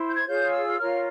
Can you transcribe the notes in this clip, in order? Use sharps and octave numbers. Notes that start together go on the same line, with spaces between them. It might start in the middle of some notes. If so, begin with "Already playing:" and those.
Already playing: E4 C5
G6
G#6
F4 G#4 C#5 G6
E6
F4 A#4 C#5 F6